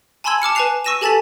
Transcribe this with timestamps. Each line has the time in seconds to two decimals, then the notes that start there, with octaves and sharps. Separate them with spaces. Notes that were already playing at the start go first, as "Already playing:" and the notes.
0.24 G#5 A5 B5 C6 E6 G#6
0.42 A5 D6 F6 C#7
0.55 B4 G#5 A5 F#6 C7 F7
0.84 C#6 E6 A#6 D#7 E7
1.01 G4 A4 G#5 A5 A6 B6